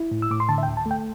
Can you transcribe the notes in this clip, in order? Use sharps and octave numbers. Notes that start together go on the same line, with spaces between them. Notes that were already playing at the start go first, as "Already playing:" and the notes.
Already playing: E4
A2
E6
A2 D6
C6
D3 A5
E5
G5
D2
A5
A3 G5